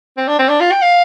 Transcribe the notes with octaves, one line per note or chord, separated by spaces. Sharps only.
C4
D4
C4
D4
F4
G5
F5